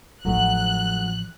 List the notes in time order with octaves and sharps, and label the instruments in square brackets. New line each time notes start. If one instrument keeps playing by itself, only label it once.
[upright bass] A1 F3 [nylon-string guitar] F#3 A3 D#4 [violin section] F#6